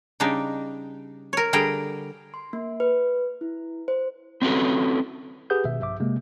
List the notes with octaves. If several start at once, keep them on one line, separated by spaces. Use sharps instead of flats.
C#3 G3 D4 D#4
A#4 C#5
D3 G3 G#4 G5 A#5
C6
A#3
B4
E4
C5
C4 C#4 E4 F#4 A4 B4
G4 G#4 B4 F#5 D#6 G6
G#1 B2 E5
A#1 G2 E5 D6
C3 G#3 A#3